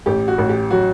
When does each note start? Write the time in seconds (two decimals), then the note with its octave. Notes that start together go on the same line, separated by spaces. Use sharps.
0.06 A1 G4
0.28 F#4
0.38 A1
0.49 G4
0.71 F#3 F#4